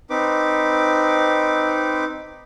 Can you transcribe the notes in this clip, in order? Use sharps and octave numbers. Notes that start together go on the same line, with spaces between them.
C4 D#4 B4 D6